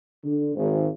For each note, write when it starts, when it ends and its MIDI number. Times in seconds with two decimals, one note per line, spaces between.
0.24 0.52 50
0.55 0.87 32